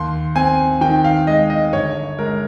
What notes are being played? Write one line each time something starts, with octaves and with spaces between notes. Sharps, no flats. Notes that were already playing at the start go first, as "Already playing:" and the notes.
Already playing: D#2 C6
C4 G#5
D#3 G5
F5
G#3 D#5
D#5
G1 C#5
G#3 A#4